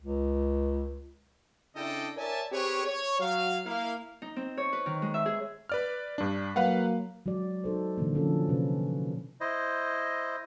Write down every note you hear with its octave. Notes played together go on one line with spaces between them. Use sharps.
C#2
C#3 D4 E4 A4 D#5 G5
A#4 C#5 D5 E5 G#5 A5
C4 G4 G#4 B4 C#5
C#5
F#3 F5
A#3 E4 F5
D#4
C4
C#5
B4
D#3
G#3
E5
G#4
B4 D5 F6
G2 D4
F#3 A#3 B4 F5 F#5
F#3 G#3 F#4 D5
D#4 A4 C5
A#2 D3 E3 A#3
D3 F3 C#4 D4 A4
C3 C#4 B4
E4 C5 D#5